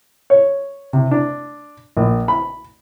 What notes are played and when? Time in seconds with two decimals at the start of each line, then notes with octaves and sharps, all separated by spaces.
0.30 C#5
0.93 C3
1.11 D4
1.97 A#1
2.28 B5